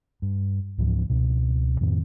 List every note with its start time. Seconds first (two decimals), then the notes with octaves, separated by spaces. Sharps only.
0.22 G2
0.78 C#2 G#2 E3 F3
1.10 C#2 B2
1.81 F2 A2 D#3 C4